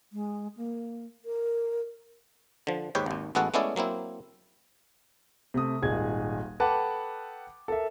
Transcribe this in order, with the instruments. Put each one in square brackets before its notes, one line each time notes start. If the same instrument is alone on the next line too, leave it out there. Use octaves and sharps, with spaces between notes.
[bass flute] G#3
A#3
A#4
[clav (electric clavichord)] D3 F3
D#2 G#2 G4 B4 C#5 G5
G#1 D#2
A1 G#3 B3 F#4 A4 F#5
G#3 A3 B3 C#4 E4 D5
F#3 A#3 C4 E4
[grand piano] C3 A3 D#6
D#1 G#1 D#4 G#4 G#6
A4 B4 F#5 G5 A5 D6
A4 A#4 E5